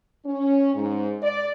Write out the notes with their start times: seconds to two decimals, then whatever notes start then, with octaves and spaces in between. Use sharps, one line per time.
0.26 C#4
0.74 G#2
1.23 D5